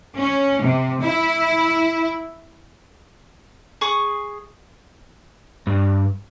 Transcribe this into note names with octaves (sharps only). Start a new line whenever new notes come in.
C#4
C3
E4
G#4 C#6 D#6
G2